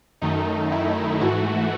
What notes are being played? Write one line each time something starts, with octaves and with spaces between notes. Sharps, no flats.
F#2 D#3 A3 D#4
E4
G#2 E3 A3 F#4